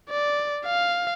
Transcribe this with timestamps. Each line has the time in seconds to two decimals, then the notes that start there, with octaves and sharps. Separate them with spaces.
0.10 D5
0.66 F5